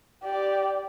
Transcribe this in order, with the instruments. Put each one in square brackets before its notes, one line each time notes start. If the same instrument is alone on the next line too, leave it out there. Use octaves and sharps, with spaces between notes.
[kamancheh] G4 D5